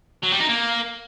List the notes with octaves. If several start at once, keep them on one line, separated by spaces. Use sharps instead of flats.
F#3
G3
D#4
A#3